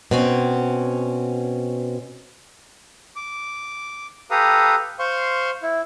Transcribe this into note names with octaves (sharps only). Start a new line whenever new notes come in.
B2 C4 C#4
D6
G4 A4 B4 F5 A#5 D#6
C5 F5 C6 C#6
E4